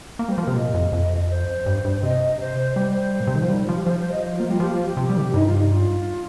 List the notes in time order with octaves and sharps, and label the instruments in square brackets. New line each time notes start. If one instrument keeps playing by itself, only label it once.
[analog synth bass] A#3 [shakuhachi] A#4
[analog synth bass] G3 [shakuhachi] C5
[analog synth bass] F3 [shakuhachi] A#4
[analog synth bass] C3
[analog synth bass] A#2 [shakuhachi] D#5
[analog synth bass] F2
F2
[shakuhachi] C5
[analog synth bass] G2
G2
[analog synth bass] C3 [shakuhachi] D#5
[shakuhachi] C5
[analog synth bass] G3 [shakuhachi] C5
[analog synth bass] A#2
C3
D#3
F3
[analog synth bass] G3 [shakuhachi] D#4
[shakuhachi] F4
[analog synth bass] F3
[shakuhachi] G4
[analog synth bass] F3 [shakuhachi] C5
[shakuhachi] C5
D#5
C5
F4
[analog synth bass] A#3
[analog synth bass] G3 [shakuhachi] F4
[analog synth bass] F3 [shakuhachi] G4
[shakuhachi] F4
G4
[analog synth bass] C3
G3
D#3
C3
[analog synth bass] G2 [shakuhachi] D#4
[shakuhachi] F4
D#4
F4